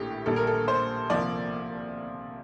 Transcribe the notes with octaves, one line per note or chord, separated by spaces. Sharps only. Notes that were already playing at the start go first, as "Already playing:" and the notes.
Already playing: A#1 A2 G4
A#1 A#2 G3 A4
A#4
A4
C5
C2 A#2 F3 D5